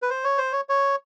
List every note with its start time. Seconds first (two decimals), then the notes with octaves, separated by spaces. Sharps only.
0.02 B4
0.10 C5
0.24 C#5
0.38 C5
0.52 C#5
0.69 C#5